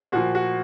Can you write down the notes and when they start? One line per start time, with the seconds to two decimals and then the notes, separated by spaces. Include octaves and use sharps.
0.12 A#2 F3 F#4
0.35 F#4